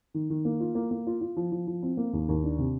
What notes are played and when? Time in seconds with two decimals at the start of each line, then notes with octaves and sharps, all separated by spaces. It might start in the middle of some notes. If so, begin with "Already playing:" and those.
0.14 D#3
0.30 D#3
0.45 A#3
0.60 F4
0.75 A#3
0.91 A#3
1.07 F4
1.21 F4
1.36 F3
1.52 F3
1.67 F3
1.83 C4
1.97 A#3
2.13 D#2
2.28 D#2
2.44 D4
2.58 C3